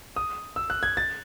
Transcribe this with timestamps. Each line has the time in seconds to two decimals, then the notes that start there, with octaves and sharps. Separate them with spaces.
0.16 D#6
0.56 E6
0.70 F#6
0.83 G#6
0.97 A6